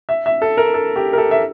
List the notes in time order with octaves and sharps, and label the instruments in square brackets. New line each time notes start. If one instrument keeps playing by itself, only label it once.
[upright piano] E5
E5
A4
A#4
A4
G4
A#4
A4
E5